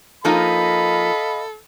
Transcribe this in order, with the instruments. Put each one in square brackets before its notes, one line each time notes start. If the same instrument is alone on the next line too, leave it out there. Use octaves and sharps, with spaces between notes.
[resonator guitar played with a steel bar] F3 A#3 D#4 [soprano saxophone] A4 [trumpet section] D#5 F5 B5